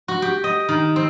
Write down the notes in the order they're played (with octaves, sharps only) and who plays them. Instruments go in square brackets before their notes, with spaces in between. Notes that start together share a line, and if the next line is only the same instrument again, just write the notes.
[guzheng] F#4
G4
D#5
D#3
C4